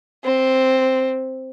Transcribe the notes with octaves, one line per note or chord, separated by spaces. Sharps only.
C4